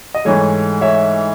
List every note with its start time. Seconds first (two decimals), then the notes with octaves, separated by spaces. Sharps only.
0.15 D#5
0.25 G#2 E3 A3 C#5
0.81 C#5 E5